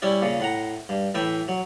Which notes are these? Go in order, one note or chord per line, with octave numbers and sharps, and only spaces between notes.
G3 C#4 E4 D5
A#2 C#3
A2 F#5 A#5
G2
A2 E3 E5 G5
F#3